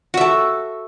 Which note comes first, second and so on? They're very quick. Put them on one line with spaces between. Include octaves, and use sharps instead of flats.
F#4 E5 A4